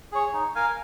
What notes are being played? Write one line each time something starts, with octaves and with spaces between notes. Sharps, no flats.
G#4 C#5
D#4
A#4 F5 G#5